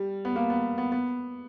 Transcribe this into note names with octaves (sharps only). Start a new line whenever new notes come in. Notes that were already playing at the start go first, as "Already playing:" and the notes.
Already playing: G3
B3
A#3
B3
B3
B3